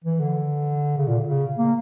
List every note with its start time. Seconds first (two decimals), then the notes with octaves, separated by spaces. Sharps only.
0.04 E3
0.20 D3
0.97 C#3
1.07 A#2
1.28 C#3
1.58 A#3